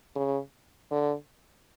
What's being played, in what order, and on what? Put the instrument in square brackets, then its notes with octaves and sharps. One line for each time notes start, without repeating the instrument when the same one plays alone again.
[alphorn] C#3
D3